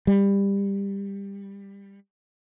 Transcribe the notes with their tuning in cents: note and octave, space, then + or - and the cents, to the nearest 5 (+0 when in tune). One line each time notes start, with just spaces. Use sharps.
G3 +20